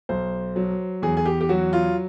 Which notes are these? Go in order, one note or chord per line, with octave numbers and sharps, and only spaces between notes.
B1 C5
F#3
E2 G#4
G#4
G4
G4
F#3 F#4
F4